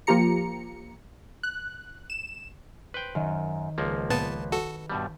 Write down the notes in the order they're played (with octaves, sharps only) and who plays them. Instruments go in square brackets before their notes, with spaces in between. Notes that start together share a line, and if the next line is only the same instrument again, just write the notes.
[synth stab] F3 A#3 F4 G4 A#5 C#7
F#6
E7
[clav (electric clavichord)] B4 G5 [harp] C5
[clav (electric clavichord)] F#2 [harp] D#3
[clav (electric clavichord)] C#2 F3 A#3
[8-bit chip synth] A#2 B3 A5 [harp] B4
[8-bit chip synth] F#4 A4
[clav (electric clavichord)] G2 B2 G3